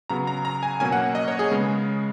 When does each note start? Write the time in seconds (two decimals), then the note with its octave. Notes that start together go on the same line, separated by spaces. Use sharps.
0.09 C#3 F#3 B3 A#5
0.27 A#5
0.45 A#5
0.63 G#5
0.80 B2 F#3 A#3 C#4 G#5
0.92 F#5
1.15 D#5
1.28 C#5
1.39 G#4
1.51 C#3 G#3 B3